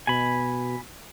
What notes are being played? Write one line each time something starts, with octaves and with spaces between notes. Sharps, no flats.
B2 G#5 B5